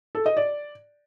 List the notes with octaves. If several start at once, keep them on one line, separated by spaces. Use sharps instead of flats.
A4
D#5
D5